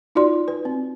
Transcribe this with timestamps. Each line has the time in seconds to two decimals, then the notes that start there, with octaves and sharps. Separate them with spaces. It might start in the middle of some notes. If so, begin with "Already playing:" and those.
0.15 D#4 F4 F#4 D5 C6
0.48 B4
0.65 C4